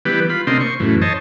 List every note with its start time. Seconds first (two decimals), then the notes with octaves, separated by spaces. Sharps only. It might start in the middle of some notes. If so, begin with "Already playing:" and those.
0.05 E3 G3 B3 G4 B4
0.30 F4 B5
0.47 C3 A#3 C4 D4 D#5 C6
0.60 C5 C#6
0.80 F#2 A2 E3
1.02 C5 C#5 D#5 A5